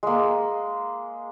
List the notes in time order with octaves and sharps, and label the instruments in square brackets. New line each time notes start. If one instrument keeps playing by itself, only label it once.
[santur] G#3 A#3